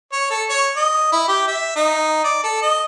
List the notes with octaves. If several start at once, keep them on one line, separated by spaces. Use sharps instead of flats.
C#5
A4
C#5
D#5
E4
G4
E5
D#4
D5
A4
D#5